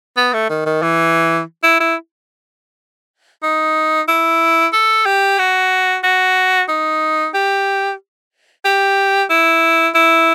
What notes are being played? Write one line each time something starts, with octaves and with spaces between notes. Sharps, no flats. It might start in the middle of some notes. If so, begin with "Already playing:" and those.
B3
A3
D#3
D#3
E3
E4
E4
D#4
E4
A4
G4
F#4
F#4
D#4
G4
G4
E4
E4